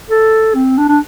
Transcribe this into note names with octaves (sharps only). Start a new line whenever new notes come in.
A4
C4
D4
D4